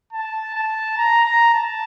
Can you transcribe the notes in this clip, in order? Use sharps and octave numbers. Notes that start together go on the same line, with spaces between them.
A5
A5
A#5
A#5
A5